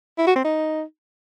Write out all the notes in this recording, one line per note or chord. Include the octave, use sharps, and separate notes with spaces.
E4
F#4
C4
D#4